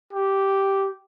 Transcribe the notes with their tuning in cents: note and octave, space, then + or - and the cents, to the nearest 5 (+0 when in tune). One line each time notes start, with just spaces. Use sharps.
G4 -5